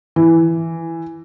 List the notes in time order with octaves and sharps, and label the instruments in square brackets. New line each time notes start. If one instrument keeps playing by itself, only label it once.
[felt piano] E3